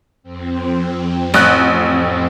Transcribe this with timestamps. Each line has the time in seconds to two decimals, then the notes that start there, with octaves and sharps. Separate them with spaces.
0.23 F2 C4
1.34 A1 F#6